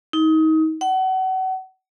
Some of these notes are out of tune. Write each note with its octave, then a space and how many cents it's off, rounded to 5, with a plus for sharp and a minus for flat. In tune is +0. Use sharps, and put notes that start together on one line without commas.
D#4 +30
F#5 +30